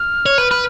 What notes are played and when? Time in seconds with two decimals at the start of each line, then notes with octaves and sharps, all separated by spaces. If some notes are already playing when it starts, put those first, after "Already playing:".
Already playing: F6
0.26 C#5
0.38 B4
0.51 B4